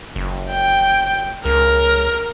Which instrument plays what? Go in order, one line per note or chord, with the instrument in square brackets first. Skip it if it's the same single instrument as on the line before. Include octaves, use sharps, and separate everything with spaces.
[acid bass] F#1
[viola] G5
[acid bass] C#2 [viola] A#4